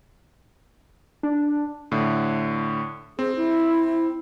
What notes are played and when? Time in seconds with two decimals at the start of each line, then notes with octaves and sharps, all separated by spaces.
1.23 D4
1.92 A2 D3
3.19 C4 G#4
3.36 E4